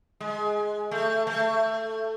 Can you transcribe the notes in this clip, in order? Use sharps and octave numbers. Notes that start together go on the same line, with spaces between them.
G#3
A3
A3